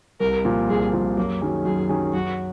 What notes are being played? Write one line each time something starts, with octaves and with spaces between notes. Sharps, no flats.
C2 A#4
A#2 F3
C2 G#4
A#2 F3
F#2 A#3
D#3 F#3 C#4 G#4
F#2 G#4
D#3 F#3 C#4 G#4
F#2 F#4